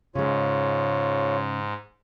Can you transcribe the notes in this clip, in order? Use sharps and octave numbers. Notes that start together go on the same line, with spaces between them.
G#2 C#3 G#3 F4 C#5